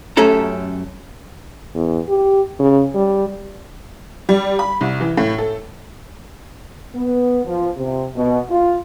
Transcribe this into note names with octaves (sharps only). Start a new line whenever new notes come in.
F#2 A3 C#4 G4 A4 A#5
E2
G4
C#3
G3
G3
B5
C2
E3
A2
A4
B3
F3
C3
B2
F4